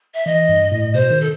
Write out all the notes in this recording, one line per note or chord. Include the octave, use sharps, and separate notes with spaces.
E5
E3 D#5
G2
A2
B2 C5
D#3
A4